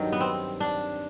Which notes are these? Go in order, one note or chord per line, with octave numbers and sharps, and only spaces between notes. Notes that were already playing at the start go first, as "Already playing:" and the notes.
Already playing: G2 D#3 F#3
B3
C4
D4